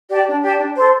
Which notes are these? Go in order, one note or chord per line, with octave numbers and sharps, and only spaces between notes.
G4 D5 A5
D4
G4 D5 A5
D4
A4 C5